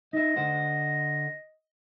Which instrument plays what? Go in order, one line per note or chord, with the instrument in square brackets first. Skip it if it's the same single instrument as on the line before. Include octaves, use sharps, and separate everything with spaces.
[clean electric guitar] D#4 E5 [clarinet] D#5
[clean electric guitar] D3 C5 F#5